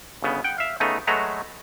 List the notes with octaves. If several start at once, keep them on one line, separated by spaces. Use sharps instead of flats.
G1 C#3 B3
F#5 G5
E5 F5
C#3 A3 B3 D#4
F#3 G#3 A3 F#4 B4 A#5